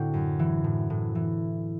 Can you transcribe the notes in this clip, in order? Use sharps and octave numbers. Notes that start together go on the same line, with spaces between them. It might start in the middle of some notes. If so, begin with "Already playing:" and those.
Already playing: A2 D3 C4 F#4
F#2
E3
A2
A2
E3